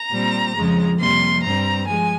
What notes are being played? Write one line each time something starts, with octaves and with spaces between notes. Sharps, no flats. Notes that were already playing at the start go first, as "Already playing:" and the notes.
Already playing: A#5
A#2 G3 C4
F2 C#3 F3 G#3
F2 C3 G3 A#3 C6
G2 G3 C4 A#5
F3 G#3 G#5